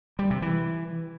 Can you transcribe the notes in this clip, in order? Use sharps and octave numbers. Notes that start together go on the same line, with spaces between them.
G3
C3
E3